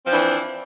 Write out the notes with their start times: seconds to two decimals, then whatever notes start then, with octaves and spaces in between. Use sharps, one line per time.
0.04 C4
0.07 F3
0.10 D4
0.12 E3